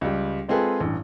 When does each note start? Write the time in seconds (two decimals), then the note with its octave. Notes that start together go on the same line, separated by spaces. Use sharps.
0.01 C#2 G3
0.48 G#3 C4 F4 G#4 A4 B4
0.80 A1 G2